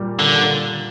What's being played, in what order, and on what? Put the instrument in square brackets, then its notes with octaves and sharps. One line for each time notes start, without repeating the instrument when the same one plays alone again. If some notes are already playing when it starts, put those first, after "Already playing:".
Already playing: [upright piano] A#2 G3
[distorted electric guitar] D3 [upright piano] A#3